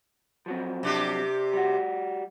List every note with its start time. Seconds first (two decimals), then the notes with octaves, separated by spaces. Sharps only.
0.46 F3 F#3 C4
0.83 C3 D4 G4
1.53 G3 F#4